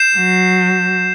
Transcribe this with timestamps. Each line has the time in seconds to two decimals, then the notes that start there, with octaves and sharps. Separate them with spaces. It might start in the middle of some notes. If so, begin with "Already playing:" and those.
Already playing: G6 C7 E7
0.16 F#3